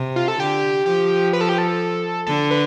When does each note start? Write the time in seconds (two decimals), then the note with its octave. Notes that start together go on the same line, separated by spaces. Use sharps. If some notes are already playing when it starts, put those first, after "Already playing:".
Already playing: C3
0.16 F4
0.28 A4
0.39 D3 G4
0.86 F3 G4
1.33 B4
1.41 A4
1.49 G4
1.58 A4
2.27 D3 A4
2.51 B4